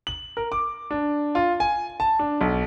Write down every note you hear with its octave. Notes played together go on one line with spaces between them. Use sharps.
F#7
A#4
D6
D4
F4
G#5
A5
D4
B1